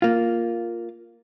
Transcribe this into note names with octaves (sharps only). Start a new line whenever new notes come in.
A#3 F4